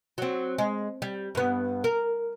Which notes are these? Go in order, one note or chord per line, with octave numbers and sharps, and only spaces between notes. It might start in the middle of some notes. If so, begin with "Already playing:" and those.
F#3 C4
G#3
G3
G2 B3
A#4